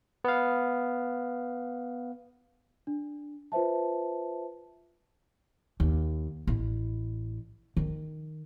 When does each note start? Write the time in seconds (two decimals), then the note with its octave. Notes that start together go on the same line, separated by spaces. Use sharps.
0.24 B3 F5
2.87 D4
3.52 F4 B4 C5 E5 A5
5.80 D#2
6.47 A1 E4
7.77 D#3